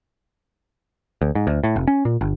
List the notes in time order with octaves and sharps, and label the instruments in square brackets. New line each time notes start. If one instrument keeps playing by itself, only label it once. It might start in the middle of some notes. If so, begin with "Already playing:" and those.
[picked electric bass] D2
G#2
D2
A2
F1
C#4
A#2
G1